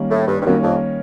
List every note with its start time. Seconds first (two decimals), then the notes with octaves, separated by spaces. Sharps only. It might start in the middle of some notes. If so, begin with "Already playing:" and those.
Already playing: D#3 G3 A#3 C#4
0.10 A2
0.27 G2
0.40 G2
0.45 F#2 D#3 G3 A#3 C#4
0.62 F2